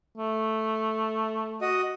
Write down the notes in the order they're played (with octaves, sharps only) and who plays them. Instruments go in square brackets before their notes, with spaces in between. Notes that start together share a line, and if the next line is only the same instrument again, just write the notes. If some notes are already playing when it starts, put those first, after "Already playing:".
[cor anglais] A3
[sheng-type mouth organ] F#4 D#5